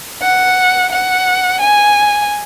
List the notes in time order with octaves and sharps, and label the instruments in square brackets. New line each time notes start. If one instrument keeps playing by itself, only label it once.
[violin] F#5
F#5
G#5